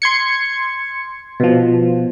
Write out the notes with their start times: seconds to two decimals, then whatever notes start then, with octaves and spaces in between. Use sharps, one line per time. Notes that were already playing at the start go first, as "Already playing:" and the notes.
0.02 C6 G#6 C#7
1.40 B2 F3